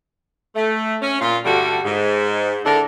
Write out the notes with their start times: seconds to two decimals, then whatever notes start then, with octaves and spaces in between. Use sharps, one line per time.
0.56 A3
1.02 C#4
1.21 A#2 F4
1.45 G2 D3 G3 A3 F#4
1.84 G#2
2.65 D3 D4 E4 A4 A#4